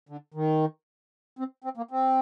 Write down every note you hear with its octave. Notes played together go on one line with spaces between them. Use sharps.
D3
D#3
C4
C4
A#3
C4